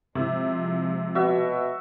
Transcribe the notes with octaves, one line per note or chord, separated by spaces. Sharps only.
C3 F3 G#3 E4
B2 F#4 E5